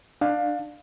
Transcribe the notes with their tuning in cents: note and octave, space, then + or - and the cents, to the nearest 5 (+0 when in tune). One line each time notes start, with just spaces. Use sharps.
D4 +20 F5 +20